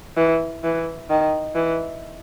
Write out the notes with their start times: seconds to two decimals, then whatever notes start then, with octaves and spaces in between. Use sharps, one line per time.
0.17 E3
0.64 E3
1.10 D#3
1.56 E3